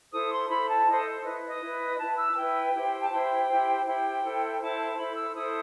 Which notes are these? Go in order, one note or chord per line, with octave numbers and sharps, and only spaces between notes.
E4 A4 C5 D#6
C6
E4 A4 C5 B5
A5
E4 A4 C5 D#5
E4 B4 D#5
D#5
E4 B4
E4 B4 A5
E6
A5
E4 B4 G5
E4 G4 C5
A5
E4 G4 C5 G5
E4 G4 C5
E4 G4 C5 G5
E4 A4 C5
E4 A4 C5 A5
E4 A4 C5 B5
E6
E4 A4 C5 D#6